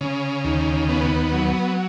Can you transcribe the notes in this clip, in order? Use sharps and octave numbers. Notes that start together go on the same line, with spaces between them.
C#3
D#2
B3
F#3